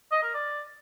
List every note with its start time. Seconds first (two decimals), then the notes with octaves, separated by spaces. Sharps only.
0.12 D#5
0.23 A#4
0.34 D5